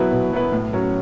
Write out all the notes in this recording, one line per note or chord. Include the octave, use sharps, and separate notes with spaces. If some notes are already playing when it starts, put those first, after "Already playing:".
Already playing: B2 F#3 B3 E4 B4
B2
F#3 B3 E4 B4
A2
F#3 C#4